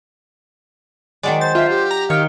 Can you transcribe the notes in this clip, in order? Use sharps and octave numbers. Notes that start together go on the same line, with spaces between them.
D#3 F#3 G#3 D5
C5 A6
D4 F4 E5
G4
A#5
D#3 C#5 F5 G5